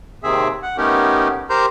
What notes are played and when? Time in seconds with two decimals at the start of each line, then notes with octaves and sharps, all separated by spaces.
0.23 D#2 C3 D#3 C4 G#4 E5
0.63 F#5
0.77 A3 B3 C#4 D#4 G4 A#4
1.50 G4 A#4 C5 A#5 C6 G6